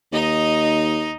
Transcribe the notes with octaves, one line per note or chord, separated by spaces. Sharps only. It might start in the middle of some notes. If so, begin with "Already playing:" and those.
D#2 D#4 D#5